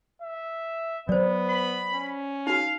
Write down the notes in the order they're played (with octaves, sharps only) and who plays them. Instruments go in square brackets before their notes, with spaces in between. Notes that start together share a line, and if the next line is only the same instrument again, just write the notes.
[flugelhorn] E5
[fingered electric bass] F#3 [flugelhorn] B3 [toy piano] C5 D5
[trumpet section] B5
[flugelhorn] C#4
[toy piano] D#4 F#4 [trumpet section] F5